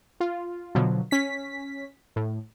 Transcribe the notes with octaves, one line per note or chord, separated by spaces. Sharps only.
F4
B2 D3 F3 F#3
C#4 B6
A2